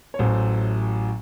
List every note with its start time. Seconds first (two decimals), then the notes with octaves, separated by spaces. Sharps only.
0.14 C#5
0.19 A1 A2 F#3 C5